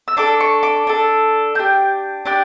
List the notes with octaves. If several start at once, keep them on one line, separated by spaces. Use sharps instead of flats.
E6
D4 A4 D6
C#6
D6
D4 A4
D4 G4 G6
D4 G4 F#6